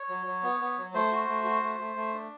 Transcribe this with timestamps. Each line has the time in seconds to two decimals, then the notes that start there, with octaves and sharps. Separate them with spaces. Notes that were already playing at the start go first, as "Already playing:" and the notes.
Already playing: C#5
0.09 F#3
0.26 F#3
0.43 B3
0.60 B3
0.78 F#3
0.94 A3 C5
1.12 F#4
1.28 A3
1.45 F#4
1.62 A3
1.79 A3
1.96 A3
2.14 D4